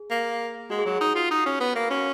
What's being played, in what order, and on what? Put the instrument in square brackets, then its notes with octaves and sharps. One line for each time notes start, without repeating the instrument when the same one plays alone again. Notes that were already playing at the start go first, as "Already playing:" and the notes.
Already playing: [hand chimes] G#4
[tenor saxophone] A#3
[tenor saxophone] G#3 [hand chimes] F#4
[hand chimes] G#4
[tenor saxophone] F#3 [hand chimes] F#4
[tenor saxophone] D#4
F4
D#4
C#4
B3
A#3
[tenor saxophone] C#4 [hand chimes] F#4